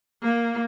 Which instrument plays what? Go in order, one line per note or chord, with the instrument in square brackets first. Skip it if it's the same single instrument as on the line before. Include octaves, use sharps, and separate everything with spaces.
[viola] A#3